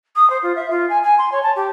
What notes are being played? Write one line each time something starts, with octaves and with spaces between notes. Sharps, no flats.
D#6
C5
F4
E5
F4
G#5
G#5
C6
C#5
A5
G4